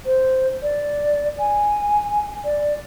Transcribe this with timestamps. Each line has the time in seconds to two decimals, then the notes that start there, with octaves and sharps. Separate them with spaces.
0.06 C5
0.63 D5
1.39 G#5
2.45 D5